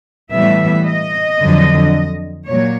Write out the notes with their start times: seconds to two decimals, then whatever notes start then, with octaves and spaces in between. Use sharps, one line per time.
0.32 A2 E3 G3 B3 E5
0.86 D#5
1.41 F2 D3 F#3
2.48 A#2 F#3 C#5